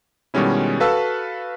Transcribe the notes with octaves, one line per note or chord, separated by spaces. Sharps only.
B2 D#3 G3 G#3 C#4 E4
F#4 A4 B4 F5 A5 E6